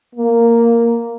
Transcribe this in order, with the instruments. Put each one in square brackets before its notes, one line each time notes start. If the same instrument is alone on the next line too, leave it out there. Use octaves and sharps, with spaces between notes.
[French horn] A#3